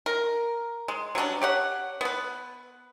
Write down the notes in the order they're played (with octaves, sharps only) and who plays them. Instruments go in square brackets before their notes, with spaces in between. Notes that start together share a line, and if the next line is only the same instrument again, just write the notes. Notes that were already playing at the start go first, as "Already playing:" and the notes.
[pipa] A#4
G#3
F#3 G3 C#4 D4
G4 C#5 F#5
B3 B4